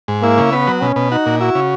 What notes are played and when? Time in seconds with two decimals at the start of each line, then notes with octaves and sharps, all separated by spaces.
0.08 G#2
0.22 A#3 E4
0.38 C#3
0.52 B3 B4
0.67 F#3
0.82 B2 C#4
0.96 B2
1.11 D#4 F#4
1.26 A#2
1.41 E4 F#4
1.55 C#3